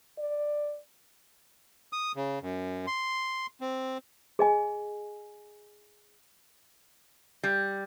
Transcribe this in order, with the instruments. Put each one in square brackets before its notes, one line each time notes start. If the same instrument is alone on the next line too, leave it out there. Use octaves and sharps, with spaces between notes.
[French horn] D5
[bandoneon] D#6
C#3
F#2
C6
C4
[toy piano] G#4 D#5 G#5
[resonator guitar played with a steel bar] G3